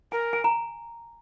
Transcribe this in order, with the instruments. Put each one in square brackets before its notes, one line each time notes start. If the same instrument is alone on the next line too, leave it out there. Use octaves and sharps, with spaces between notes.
[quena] A#4 [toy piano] G#5
[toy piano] G#5
A#5